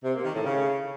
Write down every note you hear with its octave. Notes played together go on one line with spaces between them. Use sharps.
C3
A#3
D#3
A2
C#3